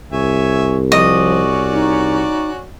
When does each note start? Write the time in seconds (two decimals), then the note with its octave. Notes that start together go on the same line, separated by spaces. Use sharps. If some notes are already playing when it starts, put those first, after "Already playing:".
0.12 C2 C#5 E5 G#5
0.92 F3 C#4 F#4 D5 D#5
1.72 D#4